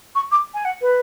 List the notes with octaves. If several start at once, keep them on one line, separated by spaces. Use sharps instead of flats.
C#6
D6
G#5
F#5
B4